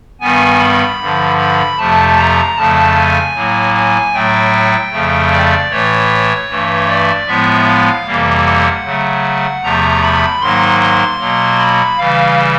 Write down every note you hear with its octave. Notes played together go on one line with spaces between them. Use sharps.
G2 D#3 G3 B3 G#5
B5
G2 D3 F3
B5
F2 C3 F3 A3 A5
A#5
F2 C#3 F3 A3 A5
G#5
A2 F#3 A#3
G#5
A2 F#3 A3 G5
F2 C#3 F3 A3
D5
A2 E3 A3 C#5
G2 E3 A3
D5
A2 F3 G#3 B3 E5
F5
F2 C3 E3 G3 A#3
F#5
C#3 F#3 A3
E2 C3 F3 A3 A#5
B5
G#2 D#3 F#3 A#3 C6
C6
B2 F#3 A#3
B5
C#3 E3 G3 F5